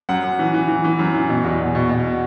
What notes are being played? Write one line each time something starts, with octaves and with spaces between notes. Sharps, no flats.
F#2 F#5
F#2
E3
E3
E3
E3
F#2
E3
B2
E2
B2
B2
B2